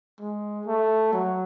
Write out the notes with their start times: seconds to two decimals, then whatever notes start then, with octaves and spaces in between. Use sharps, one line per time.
0.19 G#3
0.66 A3
1.13 F#3